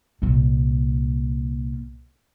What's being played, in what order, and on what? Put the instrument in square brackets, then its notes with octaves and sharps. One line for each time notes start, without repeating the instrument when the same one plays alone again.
[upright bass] C2 A#2